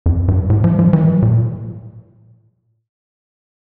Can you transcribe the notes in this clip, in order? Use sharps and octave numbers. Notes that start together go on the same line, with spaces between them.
F2
G2
A2
F3
G3
F3
E3
G3
F3
A#2